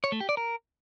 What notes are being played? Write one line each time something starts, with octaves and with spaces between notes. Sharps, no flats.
C#5
A3
G4
D5
A#4